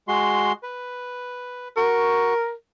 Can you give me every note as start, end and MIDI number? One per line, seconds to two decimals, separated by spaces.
0.08 0.52 56
0.08 0.52 66
0.08 0.52 84
0.63 1.68 71
1.77 2.34 66
1.77 2.53 70
1.77 2.34 85